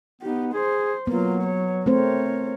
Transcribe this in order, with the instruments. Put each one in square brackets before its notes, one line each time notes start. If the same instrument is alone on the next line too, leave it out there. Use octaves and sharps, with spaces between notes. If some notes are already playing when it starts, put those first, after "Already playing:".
[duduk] B3 [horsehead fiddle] D#4 G4
[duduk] G#4 [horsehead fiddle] C5
[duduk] F#3 [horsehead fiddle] A#3 F4 [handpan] B3
[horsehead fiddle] C#5
[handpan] A3 C4 C5 [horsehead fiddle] A#4 C#5